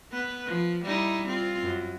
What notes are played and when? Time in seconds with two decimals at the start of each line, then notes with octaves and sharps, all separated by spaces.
0.11 B3 B4
0.47 F3
0.85 G3 D#4 E4
1.28 C4 F4
1.63 F#2